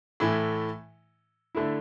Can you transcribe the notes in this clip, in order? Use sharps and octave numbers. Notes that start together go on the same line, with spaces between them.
A2 E3 A3 E4
D3 A3 E4